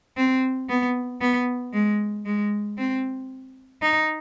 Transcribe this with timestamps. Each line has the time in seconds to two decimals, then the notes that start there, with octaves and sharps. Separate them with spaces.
0.17 C4
0.69 B3
1.21 B3
1.73 G#3
2.26 G#3
2.78 C4
3.82 D#4